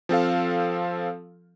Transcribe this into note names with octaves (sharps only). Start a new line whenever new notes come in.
F3 C4 A4 F5